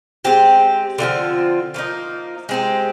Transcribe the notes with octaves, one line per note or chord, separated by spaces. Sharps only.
G#3 C4 G4
D3 F3 C4 F4
F3 A#3 D#4
G#3 C4 D#4 G4